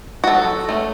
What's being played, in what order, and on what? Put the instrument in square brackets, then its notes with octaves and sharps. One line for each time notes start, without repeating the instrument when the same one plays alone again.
[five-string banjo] F#4
F#3 A4
A3 C#4